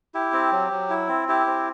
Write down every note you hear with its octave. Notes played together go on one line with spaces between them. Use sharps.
E4 G4
C4
F#3
F#3
E4
C4
E4 G4
C4